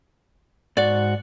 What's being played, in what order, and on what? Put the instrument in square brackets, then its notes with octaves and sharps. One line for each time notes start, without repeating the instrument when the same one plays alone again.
[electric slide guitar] G#2 F#4 [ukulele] D5